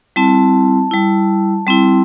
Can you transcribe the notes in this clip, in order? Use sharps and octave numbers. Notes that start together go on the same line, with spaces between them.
G3 C4 E4 A5
G3 E4
G3 C4 E4